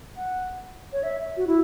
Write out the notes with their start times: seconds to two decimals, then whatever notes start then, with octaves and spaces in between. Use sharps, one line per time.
0.17 F#5
0.93 C#5
1.03 E5
1.37 F#4
1.47 E4